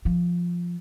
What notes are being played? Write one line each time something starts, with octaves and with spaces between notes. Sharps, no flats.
F3